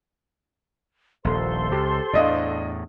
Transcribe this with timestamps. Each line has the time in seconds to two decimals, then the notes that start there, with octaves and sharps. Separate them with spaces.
1.25 D#1 A#1 A4 C5 C6
1.72 C#2 G4
2.13 E2 A2 D4 D#5 F5